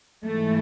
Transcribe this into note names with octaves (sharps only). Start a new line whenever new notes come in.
G#2 E3 A3